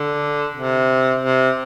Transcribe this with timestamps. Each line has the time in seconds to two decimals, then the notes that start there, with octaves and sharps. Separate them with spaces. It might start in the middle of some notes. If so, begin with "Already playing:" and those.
Already playing: D3
0.54 C3
1.20 C3